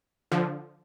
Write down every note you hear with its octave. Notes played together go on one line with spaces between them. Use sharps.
D3 F3